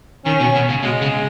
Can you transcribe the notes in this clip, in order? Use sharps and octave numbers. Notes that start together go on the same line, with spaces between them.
D#3 C#4
B2
B2
C#3
B2 G#3
C#3